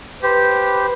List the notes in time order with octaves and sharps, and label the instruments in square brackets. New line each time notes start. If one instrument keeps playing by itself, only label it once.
[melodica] G4 C5 [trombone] B4